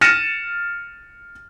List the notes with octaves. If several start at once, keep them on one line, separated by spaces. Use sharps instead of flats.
F6 A6 A#6 C#7 D#7 E7